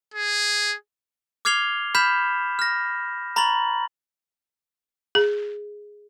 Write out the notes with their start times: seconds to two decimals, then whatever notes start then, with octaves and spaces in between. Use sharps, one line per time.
0.14 G#4
1.45 D6 F6 G#6 C7 F7 G7
1.95 B5 F6 G6 B6 E7
2.59 F6 A#6
3.36 A#5 B5 C#6 A6 F#7
5.15 G#4